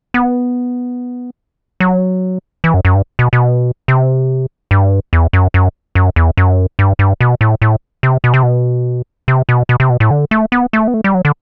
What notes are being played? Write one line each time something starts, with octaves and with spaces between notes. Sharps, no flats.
B3
F#3
E3
F#2
F#2
G2
B2
B2
C3
G2
E2
F#2
F#2
F#2
E2
F#2
G2
G2
B2
A2
A2
C3
B2
C3
B2
C3
B2
B2
C3
B2
A2
D3
A3
B3
A3
B3
A3
G3
F#3
D3